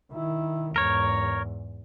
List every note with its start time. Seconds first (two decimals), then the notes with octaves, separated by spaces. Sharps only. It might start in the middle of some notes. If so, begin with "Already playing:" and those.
0.12 D#3 E4
0.76 E2 G#2 A#4 C#5